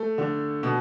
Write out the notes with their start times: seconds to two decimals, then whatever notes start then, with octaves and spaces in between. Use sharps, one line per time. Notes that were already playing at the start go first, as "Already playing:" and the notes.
Already playing: A3
0.18 D3
0.63 B2